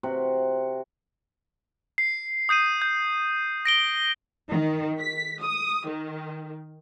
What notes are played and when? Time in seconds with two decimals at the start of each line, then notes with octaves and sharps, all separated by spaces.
0.03 C3 F#4
1.98 C7
2.49 D#6 G6 C7 D#7
2.82 G6
3.65 A#6 D7 G7
4.49 D#3
4.99 B6
5.41 D#6
5.87 D#3